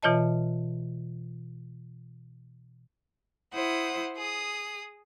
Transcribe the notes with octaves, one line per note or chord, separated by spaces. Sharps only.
B2 E3 F4 C#5 D#5 A5
E4 C5 F#5 D#6
G#4 D#6